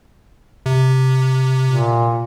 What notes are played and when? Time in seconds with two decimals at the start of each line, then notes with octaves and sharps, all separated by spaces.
0.66 C3
1.67 A#2